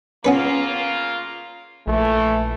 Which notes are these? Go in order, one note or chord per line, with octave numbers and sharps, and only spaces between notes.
C#3 A#3 B3 C#4 F4 B4
A#1 E3 A3